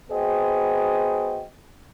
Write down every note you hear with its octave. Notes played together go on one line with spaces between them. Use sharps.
B3 F#4 G#4 C5 D#5 G5